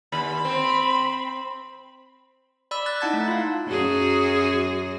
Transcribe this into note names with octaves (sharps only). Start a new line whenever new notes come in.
D#2 B5
C4
D5 B5 E6
B5 F#6 A6
D#4 E4 F#5 A5 G#6 A6
A3
F4 F5
F#2 F#4 G#4